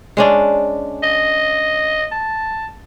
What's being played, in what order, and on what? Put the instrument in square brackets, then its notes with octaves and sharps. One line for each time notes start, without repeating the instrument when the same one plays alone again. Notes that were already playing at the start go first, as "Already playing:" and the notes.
[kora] G#3 C#4 D4
[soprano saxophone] D#5
A5